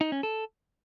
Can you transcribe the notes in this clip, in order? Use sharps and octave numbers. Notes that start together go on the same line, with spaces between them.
D#4
C#4
A4